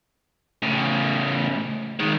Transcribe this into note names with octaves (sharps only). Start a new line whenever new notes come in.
A2 C#3
D#3 G#3